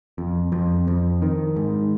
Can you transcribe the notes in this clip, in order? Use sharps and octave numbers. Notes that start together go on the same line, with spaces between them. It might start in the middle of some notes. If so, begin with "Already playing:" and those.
F2
F2
F2
D#3
G#2